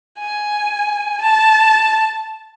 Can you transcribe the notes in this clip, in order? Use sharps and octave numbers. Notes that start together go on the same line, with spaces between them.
G#5
A5